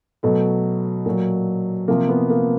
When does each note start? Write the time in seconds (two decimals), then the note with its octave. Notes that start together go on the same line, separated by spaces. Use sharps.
0.23 B2 F#3 A3
1.06 A#2 F#3
1.88 C3 F3 A#3
2.09 B3
2.30 A#3